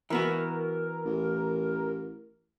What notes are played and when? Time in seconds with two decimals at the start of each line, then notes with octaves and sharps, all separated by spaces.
0.10 E3 B3 F#4 A#4
1.06 A1